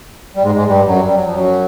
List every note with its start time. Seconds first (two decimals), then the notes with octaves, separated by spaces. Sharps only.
0.36 G3
0.43 G#2 G#3
0.55 G#2 G#3
0.68 G2 G3
0.87 F#2 F#3
1.06 G3
1.15 F#3
1.25 F3
1.34 F#2 F#3